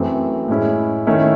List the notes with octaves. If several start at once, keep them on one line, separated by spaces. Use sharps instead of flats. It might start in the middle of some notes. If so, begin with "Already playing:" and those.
Already playing: F#2 E3 A3 C4
A2 G#3 C#4 E4
D#3 A3 C#4 E4